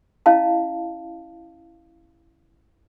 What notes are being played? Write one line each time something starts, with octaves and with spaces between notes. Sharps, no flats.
C#4 E4 D#5 F5 A5